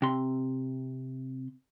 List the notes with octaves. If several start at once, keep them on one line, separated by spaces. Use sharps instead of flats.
C3 C6